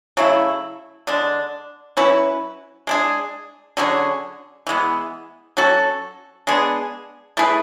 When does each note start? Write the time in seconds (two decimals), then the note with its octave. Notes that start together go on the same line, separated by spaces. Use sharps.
0.17 C#3 F#3 A3 E4
1.07 D3 G#3 D4
1.97 F#3 C#4 E4 B4
2.87 G#3 D4 G#4
3.77 D3 F#3 C#4 G#4
4.67 E3 G#3 B3
5.57 F#3 C#4 F#4 A4
6.47 G#3 B3 D4 G#4
7.37 A3 E4 G#4 B4